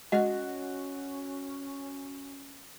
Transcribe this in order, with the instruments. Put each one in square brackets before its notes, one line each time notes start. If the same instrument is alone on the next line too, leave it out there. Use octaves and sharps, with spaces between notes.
[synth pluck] G#3 F6 [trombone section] C#4 [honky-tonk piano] F#4 [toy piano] D#5 F#5